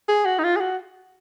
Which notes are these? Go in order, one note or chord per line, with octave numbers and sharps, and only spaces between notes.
G#4
F#4
D#4
F4
G#4
F#4